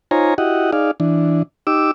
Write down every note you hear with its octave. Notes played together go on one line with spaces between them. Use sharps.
D#4 F4 C5 C#5 G#5 A#5
E4 F#4 G4 D#5 F#5
D#4 G#4 D5 F5
E3 D4
D#4 G4 D6 E6